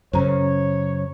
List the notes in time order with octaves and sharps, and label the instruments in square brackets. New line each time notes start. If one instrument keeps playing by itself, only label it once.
[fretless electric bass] F#2 C#3 [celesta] C5 A#5 [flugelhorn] C#5